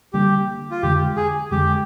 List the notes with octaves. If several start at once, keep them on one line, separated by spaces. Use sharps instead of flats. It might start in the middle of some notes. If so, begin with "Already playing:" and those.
D3 G3 A#3 G4
F4
F2 D3 G#3 G4
G#4
F2 D3 G#3 G4